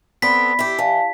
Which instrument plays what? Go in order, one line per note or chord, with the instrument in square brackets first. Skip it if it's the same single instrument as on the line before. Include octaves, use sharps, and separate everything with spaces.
[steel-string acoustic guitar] B3 C4 A4 [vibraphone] D5 B5 [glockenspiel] B6
[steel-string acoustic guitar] E4 G4
[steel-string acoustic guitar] E3 [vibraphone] D5 F5 A5